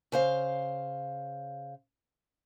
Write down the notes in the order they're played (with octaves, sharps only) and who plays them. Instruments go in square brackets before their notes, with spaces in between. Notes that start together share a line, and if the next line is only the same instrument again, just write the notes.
[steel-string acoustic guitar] C#3 C5 F5